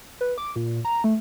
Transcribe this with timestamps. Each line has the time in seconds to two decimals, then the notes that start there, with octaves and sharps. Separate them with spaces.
0.21 B4
0.38 D6
0.56 A#2
0.85 A#5
1.04 A3